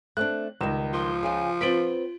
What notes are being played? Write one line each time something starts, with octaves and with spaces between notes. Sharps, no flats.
A3 C4 D4 F#6
C#2 D#3 G3 E7
F3 C6
C#3 F4 G#5
B3 C4 F4 B6 D7 F#7